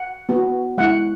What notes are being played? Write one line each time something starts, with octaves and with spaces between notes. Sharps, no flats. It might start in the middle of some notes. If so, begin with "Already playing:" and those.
Already playing: F#5
B3 F#4
G#3 E4 F#5